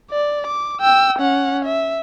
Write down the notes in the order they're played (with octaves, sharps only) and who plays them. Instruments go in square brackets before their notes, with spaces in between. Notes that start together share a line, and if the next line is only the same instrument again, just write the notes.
[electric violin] D5
D6
G5 E6
C#4 F#5
E5